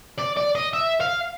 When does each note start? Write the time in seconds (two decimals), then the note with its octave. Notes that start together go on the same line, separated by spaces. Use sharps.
0.19 D5
0.37 D5
0.55 D#5
0.73 E5
1.01 F5